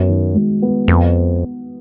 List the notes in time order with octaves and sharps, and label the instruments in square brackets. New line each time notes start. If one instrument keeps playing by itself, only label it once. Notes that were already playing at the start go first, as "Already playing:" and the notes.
Already playing: [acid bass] F#2 [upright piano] B3 F#4
[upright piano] D#3
G#3
B3
[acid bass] F2 [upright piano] B3